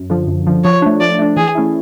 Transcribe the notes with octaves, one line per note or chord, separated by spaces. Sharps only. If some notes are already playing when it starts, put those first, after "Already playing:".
Already playing: F#2
D3 F3
F#2
D3 F3
F3 C#5
A3 D4
F3 D5
A3 D4
E3 G#4
A3 C#4 E4